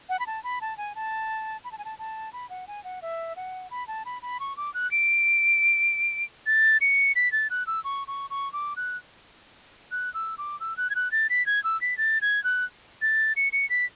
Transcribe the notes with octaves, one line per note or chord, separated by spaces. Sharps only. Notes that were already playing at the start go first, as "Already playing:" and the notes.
F#5
B5
A5
B5
A5
G#5
A5
B5
A5
G#5
A5
A5
B5
F#5
G#5
F#5
E5
F#5
B5
A5
B5
B5
C#6
D6
F#6
D7
A6
C#7
B6
A6
F#6
E6
C#6
C#6
C#6
D6
F#6
F#6
E6
D6
E6
F#6
G#6
F#6
A6
B6
G#6
E6
B6
A6
G#6
F#6
A6
C#7
C#7
B6